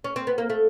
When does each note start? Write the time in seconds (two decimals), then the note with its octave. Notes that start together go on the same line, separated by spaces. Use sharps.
0.04 C#4
0.16 C4
0.27 B3
0.38 A#3
0.50 A3